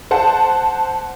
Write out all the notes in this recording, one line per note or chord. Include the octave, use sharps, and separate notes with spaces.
C5 F#5 A5